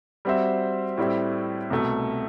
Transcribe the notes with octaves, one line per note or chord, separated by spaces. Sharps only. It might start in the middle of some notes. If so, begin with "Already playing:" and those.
G3 C4 F#4 C5 E5
A2 G3 C4 E4
C2 B2 A3